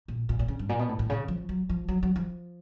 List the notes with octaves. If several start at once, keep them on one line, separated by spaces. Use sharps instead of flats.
A#2
A#2
A#2
C#3
G2
A#2
B2
A2
A2
C#3
F3
F#3
F3
F#3
F#3
F3